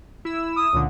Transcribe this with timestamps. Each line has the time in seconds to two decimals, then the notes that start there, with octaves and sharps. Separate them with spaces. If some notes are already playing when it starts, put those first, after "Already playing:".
0.25 E4 E6
0.57 D#6
0.73 C#2 A#2 D3